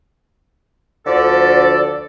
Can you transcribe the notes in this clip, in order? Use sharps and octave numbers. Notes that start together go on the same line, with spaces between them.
D2 D3 F3 A4 D5